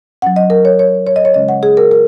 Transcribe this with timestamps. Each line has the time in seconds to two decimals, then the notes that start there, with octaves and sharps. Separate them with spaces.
0.22 F#3 C#4 F#5
0.36 D#5
0.50 A#4
0.65 C#5
0.79 C#5
1.07 C#5
1.16 D#5
1.25 C#5
1.34 C#3 G#3 C#4 D#5
1.49 F#5
1.63 G#4
1.77 A#4
1.91 A#4